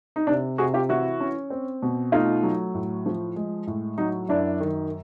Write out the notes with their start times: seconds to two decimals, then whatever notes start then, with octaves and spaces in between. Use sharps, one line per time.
0.16 D#4
0.27 C3 D4
0.58 C3 F#4 G#4
0.74 F4 G4
0.89 E3 E4 F#4
1.20 C#4
1.50 C4
1.83 B2
2.12 A3 D#4 F4
2.43 F#3
2.74 A2
3.06 F3
3.36 G#3
3.67 A2
3.98 F#3 D#4
4.29 F#2 D4 E4
4.60 D#3